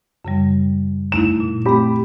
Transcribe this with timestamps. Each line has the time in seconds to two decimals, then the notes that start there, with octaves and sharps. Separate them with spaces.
0.25 F#2 C#3 G3
1.12 A3 D#4 E4 E7
1.40 A#2
1.66 A3 C4 G4 B5